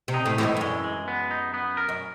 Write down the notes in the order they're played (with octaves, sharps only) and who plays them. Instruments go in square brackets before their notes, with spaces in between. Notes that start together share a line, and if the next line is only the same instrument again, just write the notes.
[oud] C3
[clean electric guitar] D#4
[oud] A2
[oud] A2 [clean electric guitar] E3
[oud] G#2
G2
[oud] F#2 [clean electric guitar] G#3
[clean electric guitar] G#3
B3
D#4
B3
A#4
[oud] F#2